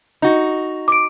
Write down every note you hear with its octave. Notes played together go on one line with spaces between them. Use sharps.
D#4 F#4
D6 D7